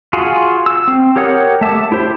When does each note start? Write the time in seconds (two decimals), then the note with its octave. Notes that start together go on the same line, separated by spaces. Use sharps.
0.13 F4 F#4 G#4
0.66 E6
0.88 C4
1.16 G4 A#4 C#5 F#5 D#6
1.61 A3 E5 A5 D6
1.92 E4 G4 C5